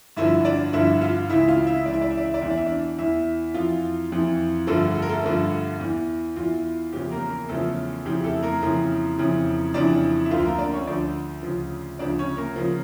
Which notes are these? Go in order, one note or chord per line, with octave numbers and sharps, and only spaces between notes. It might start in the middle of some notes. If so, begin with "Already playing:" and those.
G2 D3 F3 E4 E5
D4 D5
G2 D3 F3 E4 E5
F4 F5
C#2 C#3 E3 E4 E5
F4 F5
E4 E5
C#2 C#3 E3 D5
E5
D5
E5
D5
E5
D5
E2 E3 E5
D5
E5
D4 D5
E2 E3 E4 E5
F2 E3 F4 F5
F2 E3
G2 D3 F3 A3 A4
A4
A#4
A3 A4
G2 D3 F3
E2 E3
E2 E3 F4
E2 C#3 F3 G4
A#3 A#4
A#3 A#4
E2 C#3 F3 A3 A4
F2 C#3 E3 G4
A3 A4
A#3 A#4
F2 C#3 E3
F2 C#3 E3
F2 C#3 E3 D4 D5
E5
D2 D3 F3 F4 F5
A#3 A#4
D4 D5
C#4 C#5
D2 D3 F3 D4 D5
D2 C#3 F3
D2 C#3 F3 D4 D5
C#4 C#5
A#3 A#4
C#3 F3